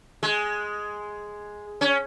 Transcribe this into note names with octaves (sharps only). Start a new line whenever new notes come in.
G#3
C#4